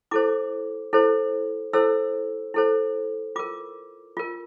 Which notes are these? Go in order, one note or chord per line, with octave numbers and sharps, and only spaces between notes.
E4 A4 C5 D6
E4 A4 C5
E4 A4 C5 E6
E4 A4 C5
F4 A#4 D6
F4 A#4